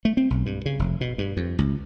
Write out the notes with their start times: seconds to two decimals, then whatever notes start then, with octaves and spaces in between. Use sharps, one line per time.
0.05 A3
0.17 C4
0.30 B1
0.46 G2
0.66 C#3
0.79 F1
1.01 B2
1.18 G2
1.37 F2
1.59 C#2